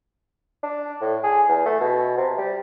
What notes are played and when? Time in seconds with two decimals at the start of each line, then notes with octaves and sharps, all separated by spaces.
0.63 D4
1.01 A2
1.23 G#4
1.49 E2
1.66 A3
1.80 B2
2.17 C3
2.38 G3